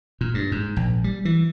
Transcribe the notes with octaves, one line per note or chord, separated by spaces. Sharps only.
A#2
G2
G#2
A#1
G3
E3